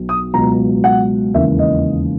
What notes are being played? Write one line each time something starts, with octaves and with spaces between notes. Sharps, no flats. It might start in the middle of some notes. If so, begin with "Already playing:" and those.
Already playing: B1 B2 F#3
D#6
C#2 B2 F#3 A#5
F#5
E1 D#2 C#3 E3 E5
D#5